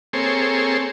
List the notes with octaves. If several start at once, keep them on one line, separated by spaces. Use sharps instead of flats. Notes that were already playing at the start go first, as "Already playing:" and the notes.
A#3 C4 G#4 A4 C5 C#5